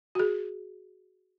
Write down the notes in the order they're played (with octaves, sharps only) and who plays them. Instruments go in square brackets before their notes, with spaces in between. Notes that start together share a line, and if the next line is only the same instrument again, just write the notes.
[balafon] F#4 G#4